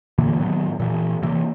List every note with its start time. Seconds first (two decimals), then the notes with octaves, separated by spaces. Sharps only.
0.18 A#2 D3 E3 A#3
0.40 A2 D#3 F#3 B3
0.80 A#2 E3
1.22 C3 E3 A#3